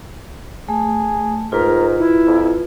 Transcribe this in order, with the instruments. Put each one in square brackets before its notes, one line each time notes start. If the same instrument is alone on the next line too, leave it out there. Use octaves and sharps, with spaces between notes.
[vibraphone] A3 [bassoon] G#4
[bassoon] G#2 [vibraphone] F4 B4 [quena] A#4
[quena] E4
[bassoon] F2